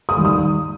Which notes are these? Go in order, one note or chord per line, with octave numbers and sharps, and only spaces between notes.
D#6
D#3 G3
D#6